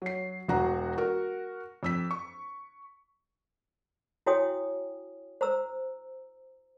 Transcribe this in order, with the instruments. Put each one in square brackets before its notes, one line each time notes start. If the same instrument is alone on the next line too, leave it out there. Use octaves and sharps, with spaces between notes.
[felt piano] F#3 C7
E1 F#4 F#5 A#5
F#4 A#4
F2 E6 B6
C#6
[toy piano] E4 F#4 C#5 G5 G#5 D#6
C5 A#5 E6